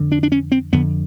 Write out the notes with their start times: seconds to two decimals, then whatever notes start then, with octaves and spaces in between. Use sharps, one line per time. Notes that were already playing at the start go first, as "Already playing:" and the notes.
Already playing: F2 D3
0.12 D4
0.23 D4
0.32 C#4
0.52 C4
0.73 F2 D3 B3